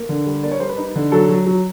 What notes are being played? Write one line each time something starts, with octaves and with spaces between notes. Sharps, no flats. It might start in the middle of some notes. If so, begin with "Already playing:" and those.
Already playing: A#3
D3
G3
A#3 D5
C#5
G3 C5
B4
D#4
D3
F#3 A4
F#3
F#3